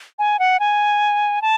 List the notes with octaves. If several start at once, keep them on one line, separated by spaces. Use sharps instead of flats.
G#5
F#5
G#5
A5